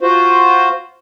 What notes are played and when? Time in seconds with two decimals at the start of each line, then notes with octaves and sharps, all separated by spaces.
0.01 F4 F#4 C5